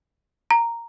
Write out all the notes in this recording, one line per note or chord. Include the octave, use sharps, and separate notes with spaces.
A#5